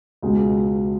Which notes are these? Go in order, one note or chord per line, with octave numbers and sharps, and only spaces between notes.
C#2 B2 G#3